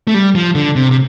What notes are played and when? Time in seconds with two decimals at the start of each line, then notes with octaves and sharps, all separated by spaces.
0.07 A3
0.14 G3
0.35 F3
0.55 D3
0.76 C3
0.91 C3